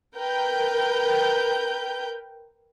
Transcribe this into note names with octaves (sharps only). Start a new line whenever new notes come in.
A#4 B4 G5 G6